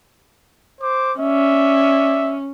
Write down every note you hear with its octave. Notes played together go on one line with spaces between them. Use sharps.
C5 D6
C#4 D5 E5